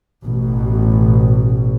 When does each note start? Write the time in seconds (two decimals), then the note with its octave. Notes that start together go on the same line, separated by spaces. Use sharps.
0.25 A1 B2